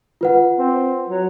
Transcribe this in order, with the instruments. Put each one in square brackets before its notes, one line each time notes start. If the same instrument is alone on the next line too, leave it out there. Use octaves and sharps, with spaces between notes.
[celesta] F4 B4 F#5
[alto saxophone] C4
F#3